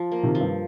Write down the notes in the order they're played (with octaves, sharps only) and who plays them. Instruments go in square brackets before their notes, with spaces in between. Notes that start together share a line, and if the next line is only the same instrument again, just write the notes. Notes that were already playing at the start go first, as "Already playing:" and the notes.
Already playing: [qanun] F3
A#3
[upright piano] C3 D#3
[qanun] F3
[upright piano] G2